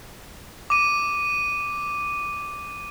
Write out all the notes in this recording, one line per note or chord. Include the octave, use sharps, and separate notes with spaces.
D6 D#7